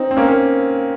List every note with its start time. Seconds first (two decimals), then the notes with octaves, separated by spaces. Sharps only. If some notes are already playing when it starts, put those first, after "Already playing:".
Already playing: C4 D#4
0.11 C4
0.17 A#3 C#4
0.28 A#3 C#4